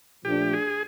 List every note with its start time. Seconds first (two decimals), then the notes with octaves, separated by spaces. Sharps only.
0.25 A#2 F3 A3 D4 G4
0.53 G#4